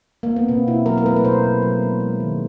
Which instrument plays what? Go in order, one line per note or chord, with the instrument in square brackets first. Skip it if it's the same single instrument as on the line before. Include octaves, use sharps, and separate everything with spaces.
[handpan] A#3
B3
B2 C4
B2 E4
F#3 A#4
A#4
A3 B4
B4
B2 C5
B2
F#3
A3
G#3
D#3